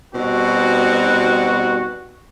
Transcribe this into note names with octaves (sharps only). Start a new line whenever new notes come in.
B2 G3 C4 D#4 F#4